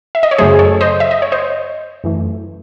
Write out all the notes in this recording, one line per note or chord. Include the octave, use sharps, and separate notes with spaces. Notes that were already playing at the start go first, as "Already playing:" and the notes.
E5
D#5
C#5
F#2 C#3 F#3 A3 G#4 C5
A4 C#5
C5 D#5
E5
D#5
C#5
C5 D#5
F#2 E3 A3